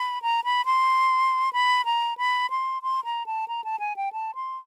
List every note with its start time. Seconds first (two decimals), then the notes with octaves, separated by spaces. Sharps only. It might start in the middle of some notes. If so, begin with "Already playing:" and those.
Already playing: B5
0.22 A#5
0.44 B5
0.65 C6
1.53 B5
1.85 A#5
2.17 B5
2.50 C6
2.83 C6
3.04 A#5
3.26 A5
3.48 A#5
3.64 A5
3.79 G#5
3.96 G5
4.13 A5
4.35 C6